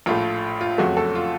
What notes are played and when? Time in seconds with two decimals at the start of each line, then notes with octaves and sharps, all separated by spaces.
0.06 A#1 A2 A3 F4
0.61 F4
0.78 F2 C#3 F#3 A3 F#4
0.97 A4
1.15 F4